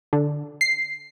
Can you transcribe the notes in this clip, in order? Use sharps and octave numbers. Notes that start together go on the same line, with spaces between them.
D3
C7